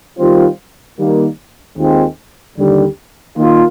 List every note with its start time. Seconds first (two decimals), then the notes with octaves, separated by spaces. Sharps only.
0.18 D#3 G3 C4 F4
0.97 D#3 G3 A#3
1.76 D#2 D#3 G#3 C4 F4
2.56 D#2 D3 G3
3.36 D#3 A#3 F4